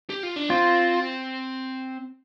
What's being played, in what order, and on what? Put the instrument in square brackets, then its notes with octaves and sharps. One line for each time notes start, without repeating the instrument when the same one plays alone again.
[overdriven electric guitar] G4
F4
D4
[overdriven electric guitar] C4 [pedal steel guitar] F4